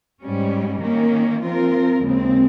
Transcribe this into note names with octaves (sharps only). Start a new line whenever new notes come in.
G#2 G3 C#4
D#3 A#3 C#4
F3 C4 F4 A#4
D#2 C#3 G#3 C4